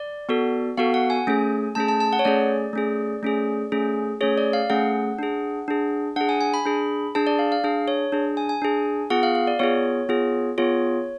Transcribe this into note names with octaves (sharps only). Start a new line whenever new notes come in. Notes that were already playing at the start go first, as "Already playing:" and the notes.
Already playing: D5
B3 F#4 A4
B3 F#4 A4 F5
F#5
G#5
A3 C#4 G#4
A3 C#4 G#4 A5
A5
A5
F#5
C#5
A3 C#4 G#4 D5
A3 C#4 G#4
A3 C#4 G#4
A3 C#4 G#4
A3 C#4 G#4 C#5
D5
F5
A3 C#4 G#4 F#5
D4 G#4
D4 G#4
D4 G#4 F#5
G#5
G#5
B5
D4 G#4
D4 G#4 A5
D5
F5
F5
D4 G#4
C#5
D4 G#4
G#5
G#5
D4 G#4
B3 F4 G#4 F#5
F5
F5
D5
B3 F4 G#4 C#5
B3 F4 G#4
B3 F4 G#4 C#5